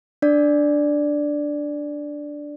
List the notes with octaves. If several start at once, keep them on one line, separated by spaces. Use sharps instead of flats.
D4 D5